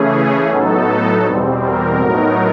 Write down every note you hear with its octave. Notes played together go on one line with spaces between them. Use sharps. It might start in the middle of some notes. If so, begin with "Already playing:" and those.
Already playing: C#3 E3 A3 C#4 G#4
A2 F#3 B3 D#4 A4
E2 B2 G3 C4
A#4
A2 F#3 B3 D#4 A#4